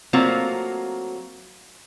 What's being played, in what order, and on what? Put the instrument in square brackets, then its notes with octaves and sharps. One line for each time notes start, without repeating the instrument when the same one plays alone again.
[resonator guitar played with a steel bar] F#3 A3 A#3 C4 F4 F#4